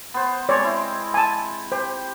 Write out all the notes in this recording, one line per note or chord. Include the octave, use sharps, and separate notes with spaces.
B3 C5
G#3 C4 C#5 D5
E4
G#5 A5
G4 C5